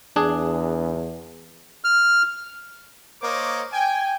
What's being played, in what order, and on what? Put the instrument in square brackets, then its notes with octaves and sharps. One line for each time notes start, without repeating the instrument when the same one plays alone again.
[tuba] E2 [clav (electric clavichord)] D4 G#4
[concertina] F6
[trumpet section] A#3 A#4 C5 C#5 D#5 D6
G5 G#5